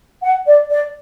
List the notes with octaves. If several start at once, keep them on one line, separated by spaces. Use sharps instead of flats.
F#5
D5
D5